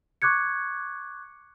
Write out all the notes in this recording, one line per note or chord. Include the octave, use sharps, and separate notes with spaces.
C#6 D6 F#6 G#6 C#7